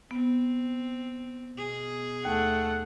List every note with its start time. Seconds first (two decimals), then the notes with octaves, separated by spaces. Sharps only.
0.11 B3 C4
1.56 B2 G#4
2.25 D#2 A3 F#5